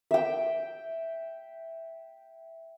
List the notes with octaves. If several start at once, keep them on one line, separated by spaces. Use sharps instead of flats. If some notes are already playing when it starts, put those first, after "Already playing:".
E5 G5